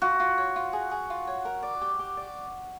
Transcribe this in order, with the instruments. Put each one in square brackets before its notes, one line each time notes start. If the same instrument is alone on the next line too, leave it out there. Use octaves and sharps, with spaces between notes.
[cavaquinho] F4 [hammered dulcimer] F#4
[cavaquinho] F4
C#5
F4
G#4
G#4
F4
C#5
A#4
D5
G4
G4
D5